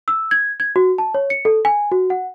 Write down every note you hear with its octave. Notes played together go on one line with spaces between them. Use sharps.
E6
G#6
G#6
F#4
A5
C#5
C#7
A4
G#5
F#4
F#5